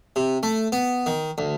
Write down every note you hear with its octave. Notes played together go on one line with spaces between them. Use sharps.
C3
A3
B3
D#3
D2